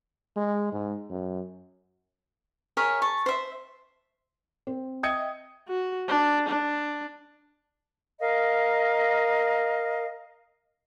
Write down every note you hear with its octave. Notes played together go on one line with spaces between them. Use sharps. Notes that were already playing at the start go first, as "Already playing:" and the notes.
G#3
G#2
F#2
G#4 A#4 C#5 E5
A5 C#6
C5 E5
C4
D#5 E5 G5 D#6 G#6 C#7
F#4
D4
D4
A#4 D#5 F5